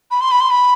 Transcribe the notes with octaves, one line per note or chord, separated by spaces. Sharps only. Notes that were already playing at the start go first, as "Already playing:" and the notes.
B5
C6
B5
C6
B5